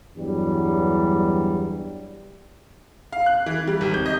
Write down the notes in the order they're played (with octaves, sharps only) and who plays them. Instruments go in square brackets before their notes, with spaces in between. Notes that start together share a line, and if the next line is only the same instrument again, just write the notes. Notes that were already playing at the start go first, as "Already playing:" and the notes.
[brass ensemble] E2 G2 E3 F#3 G3
[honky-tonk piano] F5
F#6
E3
G3
G#1
G6
D#5